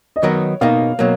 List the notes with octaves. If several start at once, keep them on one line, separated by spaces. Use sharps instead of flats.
D#5
D#3 F#3 B3 D#4 A#4 C#5
B2 A#3 D#4 F5
B2 F#3 A#3